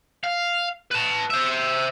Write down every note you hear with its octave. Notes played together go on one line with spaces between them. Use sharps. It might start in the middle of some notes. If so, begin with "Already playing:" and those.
F5
B4 A5
C5 E5